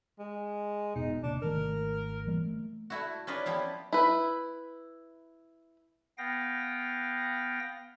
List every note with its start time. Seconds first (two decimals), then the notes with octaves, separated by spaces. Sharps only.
0.19 G#3
0.96 E1 B2 D#4
1.23 D#1 C3 A#3 D4
1.42 G#1 D#3 A3 A#4
2.27 E3 G3 A#3
2.46 A3
2.90 A3 E4 F#4
3.27 C#4 D#4 F4 B4 D5 D#5
3.46 F3 B3 E4 G4
3.93 E4 B4
6.18 B3 F5 G5 A#6